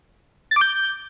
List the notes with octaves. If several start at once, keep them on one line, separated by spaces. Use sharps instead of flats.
A6
D6
G6